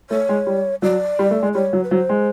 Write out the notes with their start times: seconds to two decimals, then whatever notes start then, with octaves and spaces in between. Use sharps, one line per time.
0.10 A3 C#5
0.29 G#3
0.46 G3
0.82 F#3 D5
1.19 G3
1.31 A3
1.42 G#3
1.55 G3 C#5
1.73 F#3
1.84 B4
1.91 F#3 C5
2.09 G#3